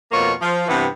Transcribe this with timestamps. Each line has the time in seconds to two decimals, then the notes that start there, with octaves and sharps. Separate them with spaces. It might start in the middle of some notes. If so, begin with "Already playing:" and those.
0.12 F2 B2 A#3 F4 C#5
0.41 F3
0.68 G2 C3 E3 B3